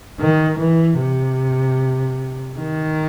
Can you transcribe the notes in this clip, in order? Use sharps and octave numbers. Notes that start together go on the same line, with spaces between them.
D#3
E3
C3
D#3